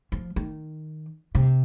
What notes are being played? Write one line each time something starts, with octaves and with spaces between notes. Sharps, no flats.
F3
D#3
C3